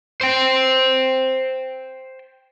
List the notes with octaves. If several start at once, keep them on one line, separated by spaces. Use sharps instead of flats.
C5 G5